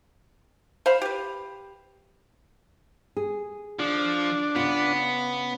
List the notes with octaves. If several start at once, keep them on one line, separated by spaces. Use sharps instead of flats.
C5 F5 B5
G4 B4
G#4
F3 D4
C#3 B3 F4